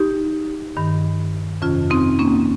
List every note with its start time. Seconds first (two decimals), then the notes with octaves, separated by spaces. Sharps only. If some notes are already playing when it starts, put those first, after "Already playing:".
Already playing: D#4 G4
0.77 G2 D#3
1.62 F2 C3 D#3 C#4 F4
1.90 C4 D#4
2.19 A#3 C#4